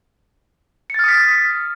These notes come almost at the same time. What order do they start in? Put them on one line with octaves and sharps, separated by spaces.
C#7 A6 F6 D#6 B6